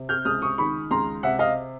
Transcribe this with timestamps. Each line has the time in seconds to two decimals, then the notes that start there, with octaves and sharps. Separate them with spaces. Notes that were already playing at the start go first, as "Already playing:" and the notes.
Already playing: C3
0.09 F6 G6
0.25 C#2 D#6 F6
0.42 C#6 D#6
0.58 D#3 B5 C#6
0.91 C#2 A#5 C6
1.23 C3 E5 F#5
1.39 D#5 F5